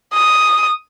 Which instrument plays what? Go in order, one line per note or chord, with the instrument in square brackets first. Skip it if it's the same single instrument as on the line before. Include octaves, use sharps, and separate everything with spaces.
[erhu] D#6